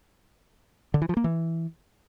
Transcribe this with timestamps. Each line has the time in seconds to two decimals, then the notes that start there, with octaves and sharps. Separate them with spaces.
0.94 D3
1.02 E3
1.09 F3
1.17 A#3
1.24 E3